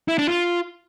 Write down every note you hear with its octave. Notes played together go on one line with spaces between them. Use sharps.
E4
D4
F4